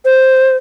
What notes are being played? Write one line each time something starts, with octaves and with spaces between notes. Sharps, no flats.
C5